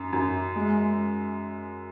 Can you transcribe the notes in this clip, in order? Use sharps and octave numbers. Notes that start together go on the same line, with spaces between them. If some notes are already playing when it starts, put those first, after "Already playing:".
Already playing: F#2
F#2
G#3